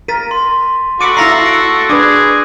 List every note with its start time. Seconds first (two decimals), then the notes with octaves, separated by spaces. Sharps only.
0.08 A#4 A6 B6 D#7
0.31 C6
1.01 F#4 A4 B5 C#6 D6 C#7 D#7
1.17 E4 F5 A#5 E6 A#6 C7
1.46 D7
1.90 D4 G#4 B4 D6 D#6 F#6